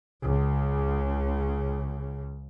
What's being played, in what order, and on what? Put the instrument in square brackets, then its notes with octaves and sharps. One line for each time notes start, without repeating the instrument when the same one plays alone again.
[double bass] C#2 C#3